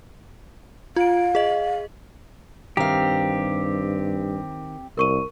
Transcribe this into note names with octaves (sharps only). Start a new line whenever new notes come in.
F4 F5 D7
G#4 D#5
G2 D#3 C4 G4 F5
C2 A#4 C#6 D#7